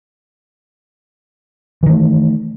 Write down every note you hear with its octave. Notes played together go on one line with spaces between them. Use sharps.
D#3 E3 A3